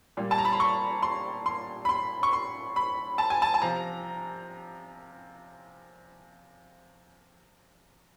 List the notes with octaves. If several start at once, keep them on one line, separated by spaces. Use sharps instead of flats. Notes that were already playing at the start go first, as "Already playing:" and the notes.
A#2 G3
A5
A#5
B5
C6
C#6
C6
C6
B5
C6
C#6
C6
B5
A5
G#5
A5
A5
C3 F3 A#5